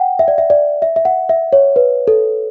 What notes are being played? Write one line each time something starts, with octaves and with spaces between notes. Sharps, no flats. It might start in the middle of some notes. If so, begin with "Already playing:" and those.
Already playing: F#5 G5
E5
D5
E5
D5
E5
E5
F#5
E5
C#5
B4
A4